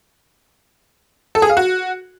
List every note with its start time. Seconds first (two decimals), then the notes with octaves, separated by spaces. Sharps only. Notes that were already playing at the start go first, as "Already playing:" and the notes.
1.35 A4
1.42 G#4
1.50 F5
1.57 F#4